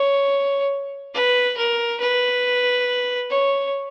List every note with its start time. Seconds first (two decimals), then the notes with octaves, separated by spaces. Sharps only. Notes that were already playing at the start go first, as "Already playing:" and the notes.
Already playing: C#5
1.15 B4
1.57 A#4
2.01 B4
3.30 C#5